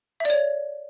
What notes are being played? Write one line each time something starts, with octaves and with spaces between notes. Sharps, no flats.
C#5 D5 E5